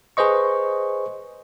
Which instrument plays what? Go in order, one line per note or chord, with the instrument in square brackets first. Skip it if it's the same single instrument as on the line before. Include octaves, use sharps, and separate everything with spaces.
[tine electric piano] G#4 B4 C5 D#5 C#6